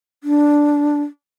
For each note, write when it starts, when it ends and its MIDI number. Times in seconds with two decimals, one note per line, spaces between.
0.24 1.02 62